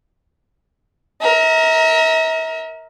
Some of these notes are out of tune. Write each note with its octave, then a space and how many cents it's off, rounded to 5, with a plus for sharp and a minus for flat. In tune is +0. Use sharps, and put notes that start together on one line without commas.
A#4 +0 E5 -40